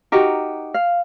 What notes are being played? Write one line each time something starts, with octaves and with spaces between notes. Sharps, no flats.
D#4 F#4 G4 A#4
F5